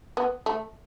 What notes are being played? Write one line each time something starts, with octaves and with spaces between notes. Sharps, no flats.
B3
A3